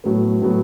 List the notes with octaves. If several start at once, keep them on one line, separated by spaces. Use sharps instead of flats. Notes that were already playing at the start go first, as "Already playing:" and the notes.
A2 F#3 B3
A2 F#3 B3